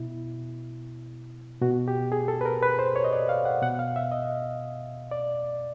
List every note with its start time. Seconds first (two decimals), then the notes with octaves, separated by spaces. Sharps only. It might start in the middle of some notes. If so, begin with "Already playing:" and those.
Already playing: B2 E4
1.62 B2 F#4
1.88 G4
2.12 G#4
2.28 A4
2.41 B4
2.45 A#4
2.62 B4
2.79 C5
2.96 C#5
3.04 D#5
3.13 D5
3.29 F5
3.45 F#5
3.62 B2 F#5
3.79 F5
3.96 E5
4.12 D#5
5.11 D5